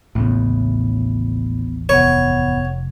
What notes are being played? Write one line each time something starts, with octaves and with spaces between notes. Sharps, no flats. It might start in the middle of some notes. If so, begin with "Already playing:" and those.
A1 D#2 A2 C#3 B3
F1 B3 C#5 F#5